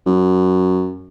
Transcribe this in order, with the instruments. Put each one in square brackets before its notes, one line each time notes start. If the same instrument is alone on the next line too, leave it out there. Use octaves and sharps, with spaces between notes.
[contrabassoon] F#2